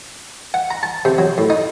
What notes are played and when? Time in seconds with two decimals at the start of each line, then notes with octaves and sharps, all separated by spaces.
0.54 F#5
0.71 A#5
0.83 A5
1.05 C3
1.18 F#3
1.38 A2
1.50 D#4